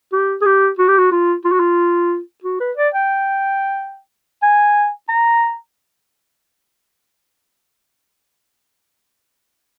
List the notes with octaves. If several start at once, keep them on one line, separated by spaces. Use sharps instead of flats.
G4
G#4
G4
F#4
G4
F#4
F4
F4
F#4
F4
F#4
B4
D5
G5
G#5
A#5